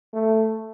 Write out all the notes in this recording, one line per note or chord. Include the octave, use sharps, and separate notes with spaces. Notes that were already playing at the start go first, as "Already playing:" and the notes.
A3